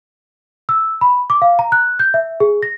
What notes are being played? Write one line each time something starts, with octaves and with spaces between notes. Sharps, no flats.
E6
B5
D6
F5
A#5
F#6
G6
E5
G#4
A#6